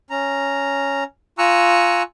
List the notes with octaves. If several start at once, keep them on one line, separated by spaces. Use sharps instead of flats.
C#4 A#5
F4 G#5 A#5 C#6 E6 F#6